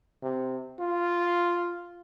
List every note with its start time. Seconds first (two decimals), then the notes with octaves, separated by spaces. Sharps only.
0.22 C3
0.80 F4